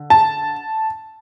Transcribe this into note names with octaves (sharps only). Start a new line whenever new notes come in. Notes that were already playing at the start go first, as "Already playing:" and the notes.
Already playing: D3
A5